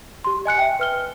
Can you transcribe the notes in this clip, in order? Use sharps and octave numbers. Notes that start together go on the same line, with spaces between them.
G4 C6
D#5 G#5 F#6 C#7
E5 G5
B4 F6 G7